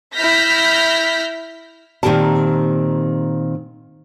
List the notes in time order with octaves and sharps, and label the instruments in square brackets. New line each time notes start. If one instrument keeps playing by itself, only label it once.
[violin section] E4 F6 G6 A#6 B6
[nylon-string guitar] A#2 D#3 C4 G4 A#4 A5